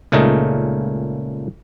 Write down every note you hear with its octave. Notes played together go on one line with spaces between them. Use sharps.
C#2 A#2 C#3 A3 D#4 D#5